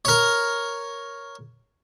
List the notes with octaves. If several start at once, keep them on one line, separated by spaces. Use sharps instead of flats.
A#4 C#5